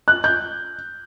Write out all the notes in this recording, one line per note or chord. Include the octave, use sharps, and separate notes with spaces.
F#6
G6